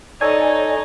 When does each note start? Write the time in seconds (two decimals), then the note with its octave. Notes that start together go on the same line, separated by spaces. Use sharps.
0.21 D#4 A4 C#5 D5 G#5